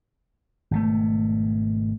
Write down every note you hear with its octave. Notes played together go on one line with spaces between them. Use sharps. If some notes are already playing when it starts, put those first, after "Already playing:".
G#1 B2 A3